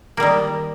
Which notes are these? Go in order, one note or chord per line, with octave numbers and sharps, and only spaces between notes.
D#3 G3 A#3